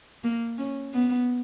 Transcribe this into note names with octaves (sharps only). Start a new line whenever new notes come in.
A#3
C#4
B3